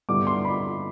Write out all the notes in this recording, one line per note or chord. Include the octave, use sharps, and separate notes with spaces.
G2 D3 G3 B3 E4 D6
C6
B5